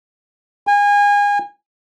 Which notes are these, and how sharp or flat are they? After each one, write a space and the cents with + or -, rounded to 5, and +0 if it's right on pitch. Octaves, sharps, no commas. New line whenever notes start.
G#5 -30